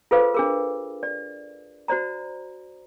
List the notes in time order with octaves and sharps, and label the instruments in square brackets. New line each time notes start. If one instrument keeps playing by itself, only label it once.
[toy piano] F4 G#4 A4 B4 C5 F5
D4 G#4 A#4
D5
F#4 C5 D5 A#5